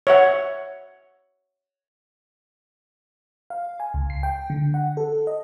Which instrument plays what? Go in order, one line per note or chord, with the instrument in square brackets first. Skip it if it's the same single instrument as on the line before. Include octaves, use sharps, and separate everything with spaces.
[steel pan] C#5 E5 F#5
[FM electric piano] F5
G#5
C#2
C7
G5
D3
F#5
A4
D#5